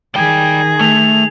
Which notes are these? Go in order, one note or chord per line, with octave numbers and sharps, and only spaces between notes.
D#3 G#4 D5 G5
A3 F7